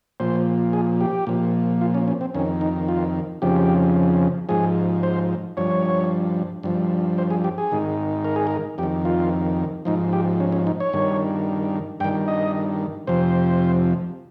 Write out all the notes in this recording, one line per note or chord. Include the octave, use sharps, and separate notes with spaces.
A#2 F3 C5
G#4
G4
A#2 F3
F4
C#4
C#4
C4
F2 D#3 C#4
D#4
F4
F2 C#3 F3 G4
G#2 F3 G#4
C5
G2 F3 C#5
G2 F3
C5
G#4
G4
G#4
G#2 D#3
A#4
G#4
A#4
F2 G4
D#3
F4
G#2 F3 D#4
G4
C#4
C#4
D#4
C#5
G2 D#3
G2 D#3 G5
D#5
F2 C3 F3 C5